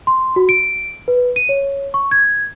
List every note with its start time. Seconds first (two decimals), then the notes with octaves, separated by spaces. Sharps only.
0.07 C6
0.36 F#4
0.49 D7
1.08 B4
1.36 D#7
1.49 C#5
1.94 C#6
2.11 G#6